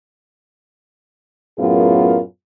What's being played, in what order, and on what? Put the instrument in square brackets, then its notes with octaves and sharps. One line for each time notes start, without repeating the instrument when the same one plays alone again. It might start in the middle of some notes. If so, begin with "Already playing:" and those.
[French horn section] F#2 A2 B3 F4 G#4 A#4